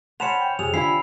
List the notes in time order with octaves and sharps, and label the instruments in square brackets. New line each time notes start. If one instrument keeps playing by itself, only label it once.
[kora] C#4 C5 [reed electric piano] F#5 A5 B5 [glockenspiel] C#7 E7 F7
[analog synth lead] G5
[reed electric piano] F2 [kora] C3 [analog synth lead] G#4 [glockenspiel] F7
[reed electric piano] D3 F4 G#5 [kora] E4 [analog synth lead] B5 [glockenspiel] C7